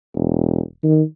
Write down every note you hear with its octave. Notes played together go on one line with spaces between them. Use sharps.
E1
D#3